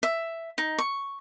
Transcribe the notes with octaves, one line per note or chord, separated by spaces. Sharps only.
E5
D#4
C#6